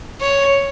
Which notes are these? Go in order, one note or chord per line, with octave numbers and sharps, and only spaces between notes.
C#5